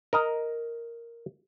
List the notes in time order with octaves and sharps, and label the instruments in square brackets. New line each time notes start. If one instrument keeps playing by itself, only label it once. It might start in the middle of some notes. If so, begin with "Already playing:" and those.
[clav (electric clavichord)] A#4 D#5 A#5